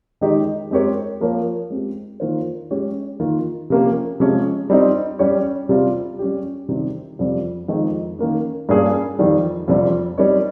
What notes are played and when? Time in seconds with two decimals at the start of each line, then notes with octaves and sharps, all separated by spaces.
0.21 D#3 G#3 D#4 G4
0.71 G#3 C4 G4 A#4 C#5
1.21 F3 A#3 F4 A#4 C#5
1.70 G#3 C4 G4
2.20 D#3 A#3 F4 C5
2.71 G#3 C#4 G4 C#5
3.20 D#3 A#3 F4
3.70 C3 F3 A#3 C#4 G4
4.20 C3 F3 G#3 C#4
4.70 G3 C4 D#4
5.19 G3 C#4 G4 C#5
5.69 C3 G3 C4 F4
6.19 G3 C#4 G4
6.69 C3 D#3 G3 C4 G4
7.19 F2 C3 G3 C4
7.68 F2 D#3 G#3 D#4
8.19 D#3 A#3 C#4
8.69 G2 G3 A#3 C#4 G#4
9.19 F2 D#3 G3
9.68 F2 C3 G3 C4
10.18 G3 C4 D#4 A#4 C#5